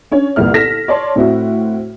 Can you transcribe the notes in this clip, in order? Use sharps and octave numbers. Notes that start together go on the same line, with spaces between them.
C#4 D4 C#5
G1 C2 A#2 E5 F6
A4 A#6 B6 E7
C#5 D5 A5 C6
A2 C4 E4 F#4